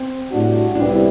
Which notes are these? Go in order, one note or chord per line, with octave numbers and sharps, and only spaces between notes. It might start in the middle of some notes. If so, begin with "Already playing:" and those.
Already playing: C4
A2 G3 D4 F#4
C2 C3 G3 B3 D4
E4